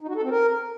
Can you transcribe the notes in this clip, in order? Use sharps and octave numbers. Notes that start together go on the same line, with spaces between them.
D#4
F#4
A4
C4
A#4